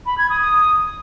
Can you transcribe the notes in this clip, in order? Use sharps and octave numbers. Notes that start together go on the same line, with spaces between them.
B5
G#6
D#6
D#6